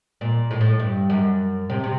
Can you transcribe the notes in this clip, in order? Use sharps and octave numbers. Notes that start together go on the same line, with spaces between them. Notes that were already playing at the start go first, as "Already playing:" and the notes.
A#2
A2
A2
G2
F#2
C3
C3